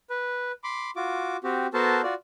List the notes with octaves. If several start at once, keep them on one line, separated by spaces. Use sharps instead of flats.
B4
B5 C6 D6
F4 F#4 D6
C4 F#4 G4
B3 F#4 A4 A#4 C5 A5
F4 F#4 D5